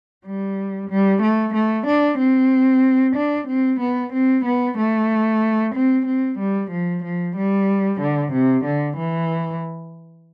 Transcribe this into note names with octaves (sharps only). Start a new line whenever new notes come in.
G3
G3
A3
A3
D4
C4
D4
C4
B3
C4
B3
A3
C4
C4
G3
F3
F3
G3
D3
C3
D3
E3